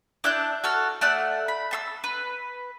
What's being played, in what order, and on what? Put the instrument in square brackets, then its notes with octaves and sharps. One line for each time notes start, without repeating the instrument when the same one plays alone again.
[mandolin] D4 E4 F#6 G6
F#4 A4 F6
A3 D5 F#5 E6
B5
A5 C6 E6
B4